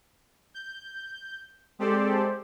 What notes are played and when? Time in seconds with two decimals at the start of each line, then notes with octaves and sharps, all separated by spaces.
0.54 G6
1.79 G#3 C4 G4 A4 C5 D5